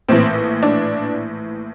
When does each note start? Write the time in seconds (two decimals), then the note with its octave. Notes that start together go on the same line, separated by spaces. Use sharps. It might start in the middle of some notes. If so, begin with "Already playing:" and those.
0.08 A#1 A2 E3 C4
0.63 D4